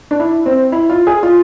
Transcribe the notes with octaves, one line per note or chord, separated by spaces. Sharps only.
D4
E4
C4
E4
F4
G#4
F4